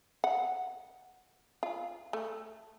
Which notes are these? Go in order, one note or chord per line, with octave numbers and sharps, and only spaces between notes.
F#5
F4
A3